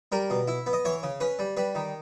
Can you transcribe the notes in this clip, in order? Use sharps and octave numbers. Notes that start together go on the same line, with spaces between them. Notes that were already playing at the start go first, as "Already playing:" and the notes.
G3 A#4
B2
E4
B3
D#5
E3 C#5
C#3
C#4 B4
G3
G3 B4
D#3